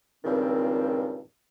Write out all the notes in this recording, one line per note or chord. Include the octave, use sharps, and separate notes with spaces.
C#2 G2 A#2 D#3 C4